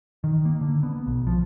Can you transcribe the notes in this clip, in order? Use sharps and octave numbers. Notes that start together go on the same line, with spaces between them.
D#3
A#3
D3
B3
B1
F3